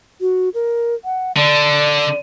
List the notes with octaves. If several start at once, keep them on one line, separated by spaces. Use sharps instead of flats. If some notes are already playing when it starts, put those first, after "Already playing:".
F#4
A#4
F#5
D3 D5